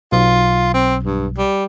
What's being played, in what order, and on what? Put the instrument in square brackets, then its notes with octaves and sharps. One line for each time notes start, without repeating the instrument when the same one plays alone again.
[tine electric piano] B1 [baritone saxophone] F4
[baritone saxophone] C4
G2
G3